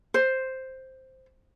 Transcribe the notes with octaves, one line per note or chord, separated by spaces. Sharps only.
C5